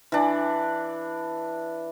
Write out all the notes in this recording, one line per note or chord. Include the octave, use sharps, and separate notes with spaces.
E3 D4